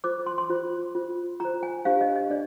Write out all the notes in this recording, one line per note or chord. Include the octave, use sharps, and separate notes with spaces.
F4 C5 D6
C6
C6
F4 C5
F4 C5
F4 C5 A#5
G#5
D4 G4 C5 F5
D#5
D#5
D4 D5